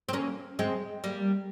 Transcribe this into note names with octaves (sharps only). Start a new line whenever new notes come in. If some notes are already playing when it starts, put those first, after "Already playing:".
C4
A#3 C#4
G#3 C4
G3 A#3